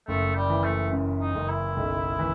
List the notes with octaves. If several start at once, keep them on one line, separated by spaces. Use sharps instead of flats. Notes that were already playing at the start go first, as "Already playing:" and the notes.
F#1 A3
G3
E3
A3
F#2
D#4
F#1
E4
B1
E3